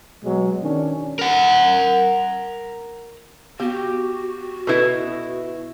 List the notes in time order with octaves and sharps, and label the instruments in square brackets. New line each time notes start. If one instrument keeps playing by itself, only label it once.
[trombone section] B2 F#3 G#3
D#3 C#4 D4
[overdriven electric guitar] A#4 F#5
[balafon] B3 [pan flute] F#4 [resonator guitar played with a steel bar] G4
[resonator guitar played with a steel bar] B2 E4 E5 [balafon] A4 B4